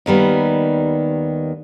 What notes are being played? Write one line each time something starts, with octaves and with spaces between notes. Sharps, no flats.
D#2 D#3 G3 B3